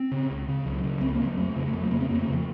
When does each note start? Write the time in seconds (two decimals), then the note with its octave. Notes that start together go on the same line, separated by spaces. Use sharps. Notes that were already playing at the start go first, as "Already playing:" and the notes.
Already playing: C4
0.11 C#3
0.30 C#2
0.48 C#3
0.65 C#2 F#3
0.83 C#3 F#3
1.01 C#2 C4
1.14 A#3
1.20 C#3
1.25 F#3
1.37 F2 A3
1.56 C#3
1.67 A3
1.73 F2 F#3
1.83 A3
1.91 C#3 A#3
2.01 C4
2.09 F2 A#3
2.22 A3
2.27 C#3
2.34 F3